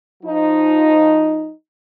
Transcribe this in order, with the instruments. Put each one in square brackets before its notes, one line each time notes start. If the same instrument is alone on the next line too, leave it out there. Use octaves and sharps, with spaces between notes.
[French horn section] F3 D#4